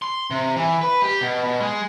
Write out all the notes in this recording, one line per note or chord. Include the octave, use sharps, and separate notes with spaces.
C6
C3
E3
B4
G4
B2
B2
G#3